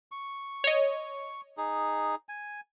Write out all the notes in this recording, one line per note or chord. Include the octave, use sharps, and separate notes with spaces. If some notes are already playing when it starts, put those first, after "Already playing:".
C#6
C#5 D#5
D#4 G#4
G#5